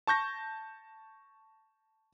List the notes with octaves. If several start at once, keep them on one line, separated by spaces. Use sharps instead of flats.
A5 C#6 G6 A#6